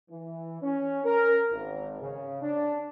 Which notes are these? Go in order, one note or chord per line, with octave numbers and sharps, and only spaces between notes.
E3
C#4
A#4
G#1
C#3
D4